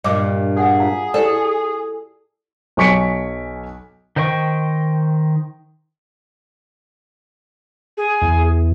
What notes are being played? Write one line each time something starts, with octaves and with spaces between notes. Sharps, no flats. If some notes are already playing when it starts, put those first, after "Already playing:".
G2 A#2 D#5 D6
G#4 F#5 G#5
F4 F5 A#5
E4 G4 A4 D5
B1 G#5 C#6 B6 C#7 D7
D#3 C5 D#5 G5 C#6
G#4
E2